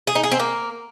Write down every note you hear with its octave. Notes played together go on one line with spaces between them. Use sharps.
G#4
D#4
G#4
C4
A#3